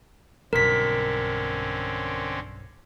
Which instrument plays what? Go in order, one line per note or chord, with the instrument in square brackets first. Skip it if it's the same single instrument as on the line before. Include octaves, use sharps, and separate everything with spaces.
[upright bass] B1 G2 [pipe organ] D3 C4 C#4 [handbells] A#4 B6